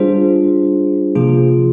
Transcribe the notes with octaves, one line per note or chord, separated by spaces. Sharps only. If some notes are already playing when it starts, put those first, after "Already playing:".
Already playing: G3 D4 F4 G#4 C5
C3 F3 A#3 F4 G#4